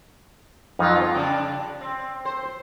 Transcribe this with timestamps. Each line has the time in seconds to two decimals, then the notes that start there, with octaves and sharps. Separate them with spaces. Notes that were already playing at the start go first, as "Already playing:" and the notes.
0.79 F2 F3 F#3 D#4 F4
1.15 C#3 G3 D4 G5 G#5
1.81 C4
2.25 C5